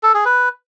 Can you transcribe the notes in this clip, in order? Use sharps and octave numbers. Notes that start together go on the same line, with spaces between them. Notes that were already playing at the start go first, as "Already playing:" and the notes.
A4
G#4
B4